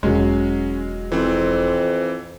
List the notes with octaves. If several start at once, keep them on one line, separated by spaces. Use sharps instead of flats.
E1 F#3 G#3 C#4
F2 E3 C4